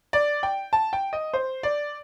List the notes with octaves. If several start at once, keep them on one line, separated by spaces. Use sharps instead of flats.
D5
G5
A5
G5
D#5
C5
D5